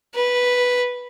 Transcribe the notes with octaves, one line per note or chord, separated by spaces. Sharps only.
B4